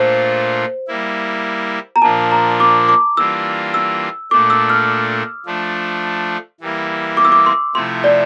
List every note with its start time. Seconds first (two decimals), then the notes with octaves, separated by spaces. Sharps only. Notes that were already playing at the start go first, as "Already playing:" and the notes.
Already playing: A#2 A3 D4 F4 C5
0.87 G3 A#3 E4
1.96 A#5
2.02 A#2 F3 A#3 D4 A5
2.31 A#5
2.60 D6
2.89 D6
3.17 E3 G3 A#3 D4 F4 E6
3.74 E6
4.31 A#2 A3 D4 D6
4.50 E6
4.70 F6
5.46 F3 A3 D4
6.61 E3 G3 A#3 E4
7.17 D6
7.25 E6
7.32 D6
7.46 C6
7.74 C3 F3 A3 E4 C6
8.04 D5